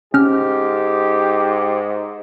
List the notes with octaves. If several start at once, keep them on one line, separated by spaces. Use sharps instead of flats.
G#2 C#4 G4 F6